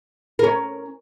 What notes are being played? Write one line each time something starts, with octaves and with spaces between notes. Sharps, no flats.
C#4 A#4